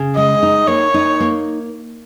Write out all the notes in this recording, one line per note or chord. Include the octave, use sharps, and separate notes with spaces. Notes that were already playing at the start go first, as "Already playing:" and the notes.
Already playing: C#3
G#3 D#5
D#4
A#3 C#5
D#4
A#3